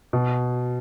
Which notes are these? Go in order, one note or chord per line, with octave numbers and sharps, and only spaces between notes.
B2